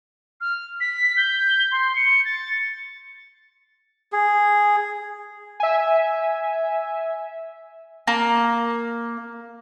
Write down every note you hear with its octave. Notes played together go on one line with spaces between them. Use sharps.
F6
B6
G6
C6
C#7
A6
G#4
E5 G#5
A#3